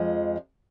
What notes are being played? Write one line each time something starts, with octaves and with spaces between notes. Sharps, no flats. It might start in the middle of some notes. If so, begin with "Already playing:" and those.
Already playing: F2 F3 G#3